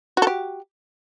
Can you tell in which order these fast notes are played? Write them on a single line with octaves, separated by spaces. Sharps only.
F#4 A4 G4